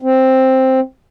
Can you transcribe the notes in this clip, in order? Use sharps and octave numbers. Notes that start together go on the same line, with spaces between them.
C4